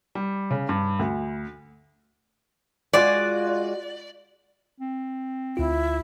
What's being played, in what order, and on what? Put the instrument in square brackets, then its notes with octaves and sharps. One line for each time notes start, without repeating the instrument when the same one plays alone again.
[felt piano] G3
C#3
G2
D2
[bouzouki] G#3 F4 F#4 [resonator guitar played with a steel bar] D5
[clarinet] C4
[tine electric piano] D2 F4 [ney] E4